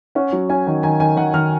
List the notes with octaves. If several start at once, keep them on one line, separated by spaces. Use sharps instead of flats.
C#4 F#5
F#3
C#4 G#5
D#3
D#3 G#5
D#3 G#5
D#3 F#5
D#3 F6